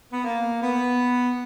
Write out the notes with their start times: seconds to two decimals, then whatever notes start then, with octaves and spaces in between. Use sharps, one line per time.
0.12 B3
0.24 A#3
0.62 B3